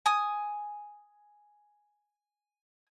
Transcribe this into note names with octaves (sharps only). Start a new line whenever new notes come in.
G#5 D#6